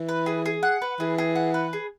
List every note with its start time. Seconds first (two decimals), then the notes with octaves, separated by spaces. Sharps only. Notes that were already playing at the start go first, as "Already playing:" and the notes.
Already playing: E3
0.09 B4
0.26 G#4
0.46 G#4
0.63 F#5
0.82 B4
1.00 E3 G#4
1.18 G#4
1.35 F#5
1.54 B4
1.73 G#4